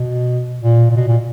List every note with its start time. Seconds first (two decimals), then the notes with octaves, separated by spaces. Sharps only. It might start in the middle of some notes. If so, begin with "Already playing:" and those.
Already playing: B2
0.61 A#2
0.91 A#2
0.96 B2
1.08 A#2